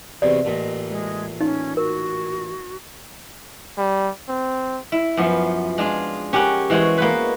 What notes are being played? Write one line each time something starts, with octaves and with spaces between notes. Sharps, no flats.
E2 C3 F#4 D5
A1 A#2 D#5
G#3
C#4 D#4
F#4 A#4
G3
C4
E4
F#2 F3 B3
G#3 D4 F4
C#4 G4 A#4 F#5
E3 G#3 F#4 C5 C#5
A#3 B3 B4